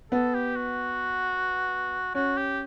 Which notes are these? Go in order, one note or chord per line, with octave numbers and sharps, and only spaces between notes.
B3 A4
G4
F#4
C#4 F#4
G4